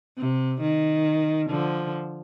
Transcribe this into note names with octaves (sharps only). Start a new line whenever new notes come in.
C3
D#3
D3 F3